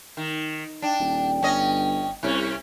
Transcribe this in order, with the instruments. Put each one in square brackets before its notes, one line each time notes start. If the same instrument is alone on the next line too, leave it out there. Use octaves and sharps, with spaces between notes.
[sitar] D#3
[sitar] D4 [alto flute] G5
[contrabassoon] D#1
[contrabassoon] G1 [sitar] C#4 D#5
[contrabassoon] C2 [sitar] C3 C#4 [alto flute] C#5